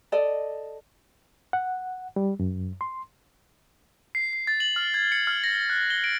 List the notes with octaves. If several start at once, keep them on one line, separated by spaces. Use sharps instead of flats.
A4 D5 D#5
F#5
G3
F#2
C6
C7
C7
A6
F#7
F6
G#6
C#7
F6
A#6
F#6
G7
D7